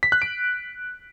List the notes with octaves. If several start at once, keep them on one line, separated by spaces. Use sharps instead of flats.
B6
F#6
D7